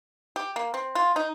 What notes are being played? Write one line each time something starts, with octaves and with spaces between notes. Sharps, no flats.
G4
A#3
C4
F4
D#4